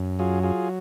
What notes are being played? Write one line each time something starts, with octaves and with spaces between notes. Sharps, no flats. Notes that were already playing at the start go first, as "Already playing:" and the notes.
Already playing: F#2
F#3 F4 G#4
F4 G#4